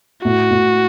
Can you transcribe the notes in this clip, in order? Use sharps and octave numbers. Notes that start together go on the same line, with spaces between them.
A2 F#4
A2